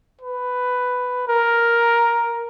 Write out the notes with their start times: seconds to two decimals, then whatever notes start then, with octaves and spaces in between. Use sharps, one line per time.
0.21 B4
1.28 A#4